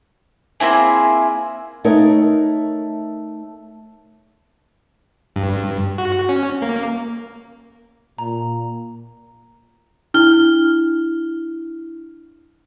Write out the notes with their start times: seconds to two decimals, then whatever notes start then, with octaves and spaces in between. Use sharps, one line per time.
0.60 A#3 C4 E4 G#4
1.84 A3 D#4 A#4 C#5
5.36 G2
5.98 F#4
6.29 C#4
6.62 A#3
8.18 A#2 A#5
10.14 D4 E4 F6 G7